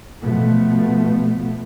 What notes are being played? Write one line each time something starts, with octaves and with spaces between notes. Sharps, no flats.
B2 F3 A3 B3